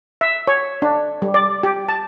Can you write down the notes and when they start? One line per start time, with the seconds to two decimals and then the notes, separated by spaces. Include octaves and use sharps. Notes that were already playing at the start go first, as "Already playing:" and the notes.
0.21 E5
0.47 C#5
0.82 D4
1.22 G3
1.34 D5
1.63 G4
1.89 A5